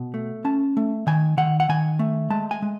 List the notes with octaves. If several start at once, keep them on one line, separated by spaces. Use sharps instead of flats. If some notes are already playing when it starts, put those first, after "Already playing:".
Already playing: B2
A3
C#4 A5
A3
D#3 G#5
D#3 F#5
F#5
D#3 G#5
A3
G#3 A5
G#5
G#3